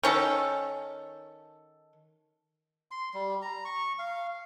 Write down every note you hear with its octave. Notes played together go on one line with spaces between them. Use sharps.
D#3 C#4 A4
C6
G3
A#5
C#6
F5